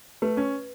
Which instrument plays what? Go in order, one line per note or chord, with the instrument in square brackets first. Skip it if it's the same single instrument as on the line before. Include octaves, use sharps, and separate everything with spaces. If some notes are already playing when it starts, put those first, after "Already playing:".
[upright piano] A3 [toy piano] B4
[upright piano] C#4